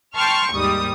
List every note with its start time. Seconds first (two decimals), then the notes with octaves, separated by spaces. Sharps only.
0.15 G5 A5 C6 C#6 F6
0.54 D#2 G#2 G3 D#6